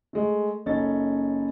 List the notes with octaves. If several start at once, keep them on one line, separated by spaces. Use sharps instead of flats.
G#3 A3
F#1 C#4 D#4 A4 A6